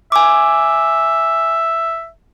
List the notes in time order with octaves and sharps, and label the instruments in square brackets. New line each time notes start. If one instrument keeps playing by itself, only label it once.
[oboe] E5 [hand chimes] G#5 D6